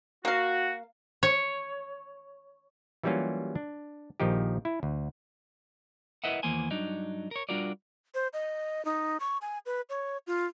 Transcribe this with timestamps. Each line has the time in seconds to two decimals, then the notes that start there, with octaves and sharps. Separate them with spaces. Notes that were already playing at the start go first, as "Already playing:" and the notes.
0.25 A#3 F#4 F5
1.23 C#5
3.03 E3 F#3 G3 A#3 C#4 F4
3.55 D4
4.20 A#1 D#3 F3 D#4 G4
4.65 E4
4.83 D2
6.24 E4 A#4 B4 D#5 E5 F#5
6.43 D#2 E3 A#3 B3 C5 G#5
6.71 G2 F#3 D4 D#4
7.31 A#4 C#5
7.49 G3 D4 F4 F#4 A#4 D5
8.14 C5
8.33 D#5
8.85 D#4
9.20 C#6
9.42 G#5
9.66 B4
9.89 C#5
10.27 F4